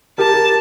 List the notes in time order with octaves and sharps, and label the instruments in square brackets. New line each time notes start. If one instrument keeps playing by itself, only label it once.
[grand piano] G4 A#4 [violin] A5
[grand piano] G4 A#4